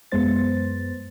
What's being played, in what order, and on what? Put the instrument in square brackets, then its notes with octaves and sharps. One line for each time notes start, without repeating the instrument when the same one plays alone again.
[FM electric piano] F#2 G#3 B3 C5 A6